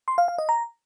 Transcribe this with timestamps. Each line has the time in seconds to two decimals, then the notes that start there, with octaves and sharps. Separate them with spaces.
0.08 C6
0.18 F5
0.28 F5
0.38 D#5
0.49 A#5